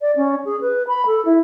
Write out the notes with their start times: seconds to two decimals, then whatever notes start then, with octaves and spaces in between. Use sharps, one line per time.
0.01 D5
0.16 C#4
0.45 G#4
0.61 B4
0.88 B5
1.06 A4
1.25 E4